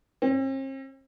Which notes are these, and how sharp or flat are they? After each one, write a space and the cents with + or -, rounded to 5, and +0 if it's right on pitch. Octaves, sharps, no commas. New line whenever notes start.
C4 +45